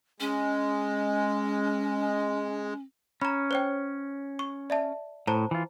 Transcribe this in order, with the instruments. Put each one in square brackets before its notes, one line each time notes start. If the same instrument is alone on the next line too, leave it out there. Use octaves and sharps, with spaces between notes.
[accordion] G#3 [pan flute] C#4
[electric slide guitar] C#4 [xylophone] A#5 B5
[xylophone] C5 C#5 G5
C#6
D5 E5 A5
[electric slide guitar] A2 [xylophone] C5 A5 A#5
[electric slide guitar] E3 F4